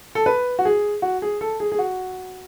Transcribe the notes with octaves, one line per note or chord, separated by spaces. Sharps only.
A4
B4
F#4
G#4
F#4
G#4
A4
G#4
G#4
F#4